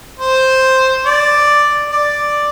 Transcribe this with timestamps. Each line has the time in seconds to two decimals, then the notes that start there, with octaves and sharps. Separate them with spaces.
0.19 C5
1.05 D5
1.91 D5